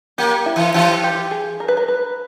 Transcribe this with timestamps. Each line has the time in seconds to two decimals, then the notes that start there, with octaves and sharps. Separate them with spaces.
0.18 A#3 G4
0.46 E4
0.56 E3
0.74 E3 G4
1.04 G4
1.31 G#4
1.60 A#4
1.68 B4
1.77 A#4
1.88 B4